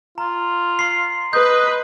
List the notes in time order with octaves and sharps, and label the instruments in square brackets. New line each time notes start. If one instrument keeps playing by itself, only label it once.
[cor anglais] F4 [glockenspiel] A#5
[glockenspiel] C6 C7
[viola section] B4 [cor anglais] D#5 [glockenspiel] G6